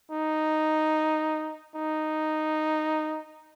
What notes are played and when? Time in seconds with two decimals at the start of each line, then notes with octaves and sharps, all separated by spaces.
0.11 D#4
1.75 D#4